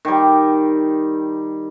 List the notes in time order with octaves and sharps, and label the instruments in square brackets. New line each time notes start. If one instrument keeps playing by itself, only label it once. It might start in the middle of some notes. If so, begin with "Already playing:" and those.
[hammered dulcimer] D#3 G3